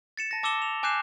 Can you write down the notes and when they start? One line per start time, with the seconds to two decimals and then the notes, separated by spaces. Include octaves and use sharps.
0.17 A6 C#7 E7
0.31 A5 A#6
0.43 A5 D6 E6 C#7 E7 G7
0.62 F7
0.83 G#5 D6 F#6 G6 C7 E7